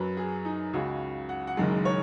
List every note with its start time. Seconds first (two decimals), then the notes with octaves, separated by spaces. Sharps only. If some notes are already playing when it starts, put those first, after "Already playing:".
Already playing: F#2 F#3 B4
0.17 G#4
0.45 D#4
0.73 C#2 C#3 G#3 F#4
1.29 F#5
1.47 F#5
1.57 F#1 F#2 D#3 G#3
1.85 C#5